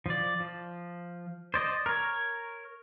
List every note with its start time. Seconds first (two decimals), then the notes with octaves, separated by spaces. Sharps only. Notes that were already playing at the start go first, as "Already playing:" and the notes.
0.06 F3 D5
0.40 F3
1.54 C5 D5 D#5
1.86 A#4 C#5